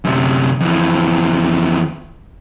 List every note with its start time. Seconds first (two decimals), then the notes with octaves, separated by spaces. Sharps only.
0.05 F#2 C3
0.60 F2 E3